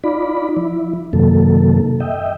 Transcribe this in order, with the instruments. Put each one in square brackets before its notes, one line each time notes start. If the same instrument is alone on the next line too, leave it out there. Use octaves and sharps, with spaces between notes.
[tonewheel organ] D#4 F4 D5 B5
F3 E4
F#2 C3 D#3 F#3 A#3 A4
D#5 E5 G5